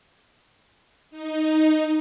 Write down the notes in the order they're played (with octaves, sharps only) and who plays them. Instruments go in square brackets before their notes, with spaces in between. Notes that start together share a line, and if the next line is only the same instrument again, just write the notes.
[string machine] D#4